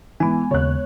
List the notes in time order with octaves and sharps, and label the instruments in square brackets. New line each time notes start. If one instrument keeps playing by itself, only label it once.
[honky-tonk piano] E3 [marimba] G#3 B3 [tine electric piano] G#5
[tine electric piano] D#2 C#3 [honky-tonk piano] C#5 F#6